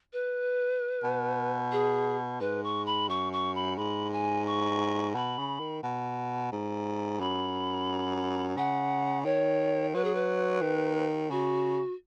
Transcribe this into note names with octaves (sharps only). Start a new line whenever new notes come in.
B4
B2
G#4
G#2 B4
C#6
B5
F#2 C#6
C#6
B5
G#2 B5
G#5
C#6
B2 B5
C#3
D#3
B2
G#2
F#2 B5
C#3 F#5
D#3 C#5
F#3 B4
G#4
B4
D#3
C#3 F#4